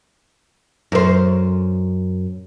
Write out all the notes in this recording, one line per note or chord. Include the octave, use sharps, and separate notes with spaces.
F#2 C5